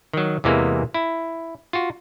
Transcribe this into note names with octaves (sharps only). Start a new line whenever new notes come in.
D#3 F#3
E2 C3 E3 G#3 A#3
E4
F4 F#4